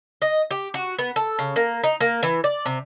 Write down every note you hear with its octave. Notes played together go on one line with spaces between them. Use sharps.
D#5
G4
F#4
B3
A4
C#3
A#3
D#4
A#3
E3
D5
C3